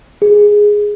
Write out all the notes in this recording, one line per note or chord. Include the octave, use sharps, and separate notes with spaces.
G#4